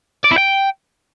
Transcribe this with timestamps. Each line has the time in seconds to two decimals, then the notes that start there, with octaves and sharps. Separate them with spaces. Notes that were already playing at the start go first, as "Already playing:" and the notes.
0.24 D5
0.31 E4
0.38 G5